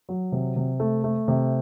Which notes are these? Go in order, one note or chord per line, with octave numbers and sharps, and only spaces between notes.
F#3
C3
C3
A3
A3
C3